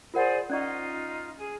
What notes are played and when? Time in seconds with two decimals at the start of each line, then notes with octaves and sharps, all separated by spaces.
0.14 F4 G#4 A#4 C5 D5 F#5
0.50 C#4 D#4 F4 D5 C#6
1.37 G#4